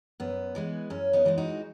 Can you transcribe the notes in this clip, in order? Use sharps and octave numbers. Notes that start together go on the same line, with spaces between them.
F#2 B3
E3 G#3 B3
F#2 C#4
B3 D#4
E3 G#3 B3
D#4 F#4